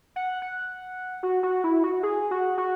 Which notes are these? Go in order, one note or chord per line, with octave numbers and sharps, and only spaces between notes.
F#5
F#5
F#4
F#4
E4
F#4
G#4
F#4
F#4